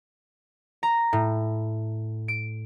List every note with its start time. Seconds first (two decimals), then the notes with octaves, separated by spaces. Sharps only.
0.83 A#5
1.13 A2
2.28 D7